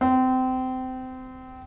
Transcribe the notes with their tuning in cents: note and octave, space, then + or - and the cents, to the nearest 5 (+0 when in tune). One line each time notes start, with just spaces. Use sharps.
C4 -25